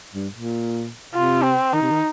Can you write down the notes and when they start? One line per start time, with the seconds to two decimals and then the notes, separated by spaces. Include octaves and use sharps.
0.14 G2
0.33 A#2
1.13 C3 F4
1.43 C4
1.73 D#3 D#4
1.82 C3
1.91 D#3